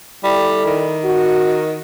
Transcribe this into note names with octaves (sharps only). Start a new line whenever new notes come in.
G3 E4 A4
D#3
F#4